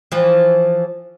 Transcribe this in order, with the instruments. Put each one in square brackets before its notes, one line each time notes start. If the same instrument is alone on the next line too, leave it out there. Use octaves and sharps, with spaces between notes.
[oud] E3 F3